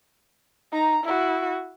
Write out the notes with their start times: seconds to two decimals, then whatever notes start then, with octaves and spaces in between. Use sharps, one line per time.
0.72 D#4 A#5
1.04 E4 F#4